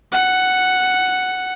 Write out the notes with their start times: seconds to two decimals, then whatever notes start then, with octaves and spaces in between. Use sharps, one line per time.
0.12 F#5 C#7